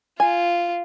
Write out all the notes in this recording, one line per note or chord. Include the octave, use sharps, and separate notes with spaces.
F4 G#5